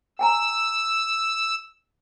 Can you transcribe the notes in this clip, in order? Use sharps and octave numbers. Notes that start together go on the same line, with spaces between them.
G5 G#5 A#5 E6